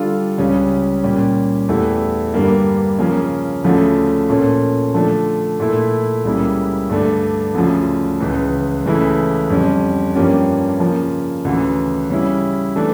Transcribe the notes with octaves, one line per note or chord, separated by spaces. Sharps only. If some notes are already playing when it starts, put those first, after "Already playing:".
Already playing: D3 G3 D4 F4 A4
C#2 C#3 G3 C#4
A#2 G3 C#4 G4
E2 E3 A3 E4 G4
G2 D3 G3 A#3
C#3 F3 A#3 C#4
D2 C#3 F3 A3
A#2 A3 C#4
D3 F3 A3 D4
A#2 A3 E4
C#2 C#3 G3 A#3 E4
G2 D3 A3 D4
D2 C#3 F3
C#2 C#3 E3
C#2 C#3 E3 A3 E4
F2 D3 G3 C#4
G2 F3 A#3 C#4 G4
C#3 F3 A#3
D2 C#3 E3
C#3 G3 C#4 E4
E3 A3 D4